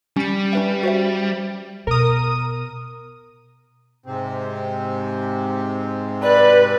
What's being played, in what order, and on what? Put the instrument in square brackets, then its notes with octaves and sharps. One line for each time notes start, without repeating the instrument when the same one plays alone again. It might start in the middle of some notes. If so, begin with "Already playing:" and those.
[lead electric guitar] G3 [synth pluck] C#4 C#7
[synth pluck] C#4 B4 E5
F#4 C5 E5
[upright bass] B2 [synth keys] A#4 D#6
[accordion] G#2 C3 C4
[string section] B4 [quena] D5